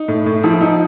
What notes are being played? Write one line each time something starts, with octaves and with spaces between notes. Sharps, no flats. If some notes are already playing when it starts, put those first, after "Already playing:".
Already playing: D#4
A2
A2
F3 E4
F3 D#4